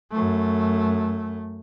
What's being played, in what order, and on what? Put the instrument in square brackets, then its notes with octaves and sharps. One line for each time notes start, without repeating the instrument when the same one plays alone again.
[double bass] F#2 A3